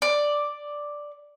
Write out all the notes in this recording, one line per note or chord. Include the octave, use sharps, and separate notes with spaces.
D5